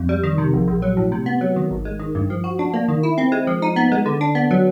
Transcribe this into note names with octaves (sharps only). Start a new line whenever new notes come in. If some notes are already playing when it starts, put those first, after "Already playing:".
Already playing: F2
G3
D#3
C3
A#1
A#1
F#3
A2
C3
B3
F#3
D#3
G#1
G#3
D#3
G2
F3
F#4
D4
A#3
D#3
E4
C4
G#3
F3
D#4
B3
G#3
D3
D4
B3
F#3